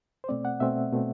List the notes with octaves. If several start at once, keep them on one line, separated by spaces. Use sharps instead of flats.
C5
B2 A3 C4 D5
F#5
B2 A3 C4 E5
B2 A3 C4